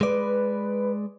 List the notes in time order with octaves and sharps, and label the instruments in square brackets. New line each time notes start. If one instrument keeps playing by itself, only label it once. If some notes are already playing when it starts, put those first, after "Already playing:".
[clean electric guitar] G#3 D5 [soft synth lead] B4